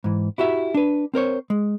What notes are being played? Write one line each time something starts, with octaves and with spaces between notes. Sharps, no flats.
G#2 E3
E4 F#4 G4 E5
D4 B4
C4 A#4 C5 C#5
G#3